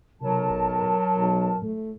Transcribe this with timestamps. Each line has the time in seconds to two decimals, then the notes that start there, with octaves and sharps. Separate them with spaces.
0.21 B1 C3 F#3 A#4 A5
0.50 A1
0.81 A2
1.16 B1
1.62 A2 A3